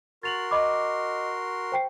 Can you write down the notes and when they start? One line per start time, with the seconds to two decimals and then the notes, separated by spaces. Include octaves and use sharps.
0.23 F#4 A#4 C6 A6 F7 F#7
0.51 D#5 B5 D6
1.72 C5 G5 C7